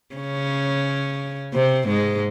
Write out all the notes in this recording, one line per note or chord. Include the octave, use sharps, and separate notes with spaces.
C#3 C#4
C3 C4
G#2 G#3